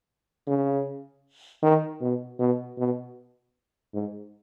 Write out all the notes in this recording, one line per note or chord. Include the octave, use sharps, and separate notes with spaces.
C#3
D#3
B2
B2
B2
G#2